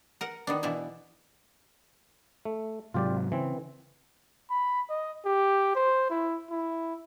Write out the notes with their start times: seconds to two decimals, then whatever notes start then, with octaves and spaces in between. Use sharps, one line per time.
0.21 A#4 F#5
0.47 D#3 B3 D4
0.63 B2 E3 D4 E4 E5
2.45 A3
2.94 G#2 C3 F#3 F4 G4 D5
3.32 C#3 E3 C4
4.51 B5
4.90 D#5
5.26 G4
5.75 C5
6.10 E4
6.50 E4